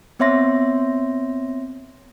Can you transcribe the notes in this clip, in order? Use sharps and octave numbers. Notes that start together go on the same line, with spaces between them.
B3 C4 C#5 E5 C6 A#6